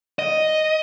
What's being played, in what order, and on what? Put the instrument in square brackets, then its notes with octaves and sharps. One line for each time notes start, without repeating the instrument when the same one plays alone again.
[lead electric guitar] D#5